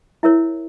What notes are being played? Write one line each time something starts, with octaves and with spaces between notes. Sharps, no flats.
E4 A#4 C#5 E5